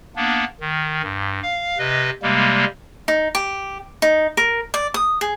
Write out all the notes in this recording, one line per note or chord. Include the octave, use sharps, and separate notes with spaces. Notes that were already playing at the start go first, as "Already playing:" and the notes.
A#3 B3 D4
D#3
G2
F5
C3 B4 D#5
C3 G3 G#3 A#3
D#4
G4
D#4
A#4
D5
D#6
G#4